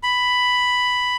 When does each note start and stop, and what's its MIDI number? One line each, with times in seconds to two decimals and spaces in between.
0.03 1.16 83